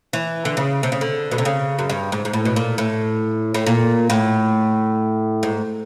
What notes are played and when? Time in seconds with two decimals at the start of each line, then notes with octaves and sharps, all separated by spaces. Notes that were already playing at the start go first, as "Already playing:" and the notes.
0.13 E3
0.45 D3
0.57 C#3
0.83 C3
0.92 C#3
1.01 D3
1.31 B2
1.38 C3
1.45 C#3
1.79 F#2
1.90 G2
2.12 G#2
2.25 G#2
2.33 A2
2.45 B2
2.56 A#2
2.78 A2
3.54 A2
3.66 A#2
4.10 A2
5.43 G#2